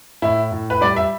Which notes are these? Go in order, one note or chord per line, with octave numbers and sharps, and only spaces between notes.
A2 E4
A2
B4
G3 D5
E5